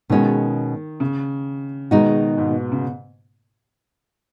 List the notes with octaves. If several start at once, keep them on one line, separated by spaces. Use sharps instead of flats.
B2 D#3 G#3 C#4 F#4
C#3
B2 D#3 G#3 D#4 F#4
G#2
B2
C#3